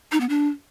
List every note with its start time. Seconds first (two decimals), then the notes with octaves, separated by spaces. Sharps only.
0.12 D#4
0.20 B3
0.29 D4